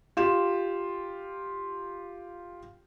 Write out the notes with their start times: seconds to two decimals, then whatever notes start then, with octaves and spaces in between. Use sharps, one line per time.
0.17 F4 G4 E7